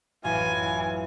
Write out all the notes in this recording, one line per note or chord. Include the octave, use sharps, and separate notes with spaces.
A1 F#2 E3 F4 G#5